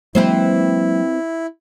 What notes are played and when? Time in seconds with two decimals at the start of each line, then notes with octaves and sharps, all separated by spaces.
0.15 E3 F#3 G#3 A#3 C4 E4 C5